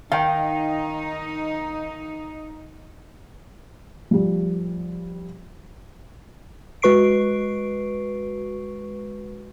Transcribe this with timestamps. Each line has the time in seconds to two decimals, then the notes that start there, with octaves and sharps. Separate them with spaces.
0.12 D#3 D#4 F5 G5
4.11 F3 G3
6.82 G#3 F#4 B4 C#6 C7 D7